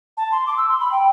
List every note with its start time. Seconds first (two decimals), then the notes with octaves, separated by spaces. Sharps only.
0.17 A5
0.32 C6
0.47 D6
0.57 E6
0.69 C6
0.80 B5
0.92 G5